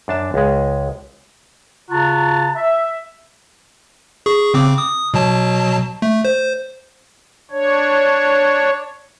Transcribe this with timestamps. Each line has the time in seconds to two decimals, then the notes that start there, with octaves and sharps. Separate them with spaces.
0.08 F#2 D4 A5
0.34 C#2 G#3
1.89 C#3 F4 F#4 A5 A#5
2.55 E5
4.26 G#4 C#6
4.54 C#3 C4 D6
4.78 D#6
5.14 B2 F#3 A5
6.02 A3
6.25 C5
7.51 D4 C#5